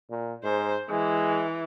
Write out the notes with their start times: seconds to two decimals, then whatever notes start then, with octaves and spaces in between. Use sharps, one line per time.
0.10 A#2
0.44 G#2 C5
0.90 E3 G#3